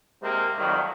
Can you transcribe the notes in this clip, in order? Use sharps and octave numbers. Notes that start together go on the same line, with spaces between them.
C3 G#3 A#3 C4
F2 D#3 F#3 G3